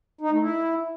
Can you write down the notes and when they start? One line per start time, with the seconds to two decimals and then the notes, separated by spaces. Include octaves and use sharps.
0.21 D#4
0.31 A3
0.41 E4